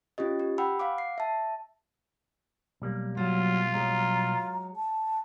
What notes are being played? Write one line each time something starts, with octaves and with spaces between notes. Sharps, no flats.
C#4 F4 G4 D#5
G4
F#5 G5 B5 E6
F5 F#5 D6
C7
E5 A5
B1 G3 A#3
F#3 F4
F#3 G#3 A#5
A5